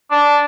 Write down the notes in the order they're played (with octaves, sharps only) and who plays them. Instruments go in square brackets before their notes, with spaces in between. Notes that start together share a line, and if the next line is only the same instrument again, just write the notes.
[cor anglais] D4